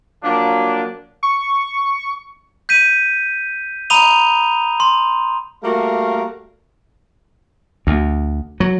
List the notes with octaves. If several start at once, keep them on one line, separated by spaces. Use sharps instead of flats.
F3 F#3 A#3 D4
C#6
G6 B6 D#7
A#5 B5 D#6 D#7 F7 G7
C6
G3 A3 A#3 F#4 A#4 F5
D2
F#3